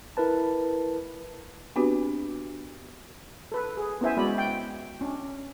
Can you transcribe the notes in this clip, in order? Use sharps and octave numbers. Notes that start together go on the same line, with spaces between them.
E4 A#4 B4 A5
B3 C4 D4 F#4 G4 B4
A4 B4
G#4
B3 C#4 E4 C5 E5 G#5
G#3 B3 F#4 D5 B5
G5
C#4 D4